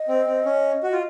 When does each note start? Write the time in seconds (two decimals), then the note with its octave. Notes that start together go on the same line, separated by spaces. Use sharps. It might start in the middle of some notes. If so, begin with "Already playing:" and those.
Already playing: D#5
0.08 C4
0.27 C4
0.45 C#4
0.83 F#4
0.92 F4